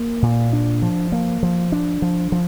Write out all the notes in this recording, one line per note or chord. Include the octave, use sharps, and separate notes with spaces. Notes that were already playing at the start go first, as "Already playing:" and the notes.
Already playing: A#3
A#2
D4
F3
A#3
F3
D4
F3
F3